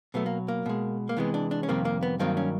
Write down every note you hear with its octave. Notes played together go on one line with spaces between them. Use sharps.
B2 F#3 A3 B3
A#3
A#3
B2 G#3
A#3
C3 E3 G#3 B3
D4
D4
C#4
F2 C3 D#3 G3 A#3 C4
A#3
B3
G2 D#3 F#3 A#3 C4
C#4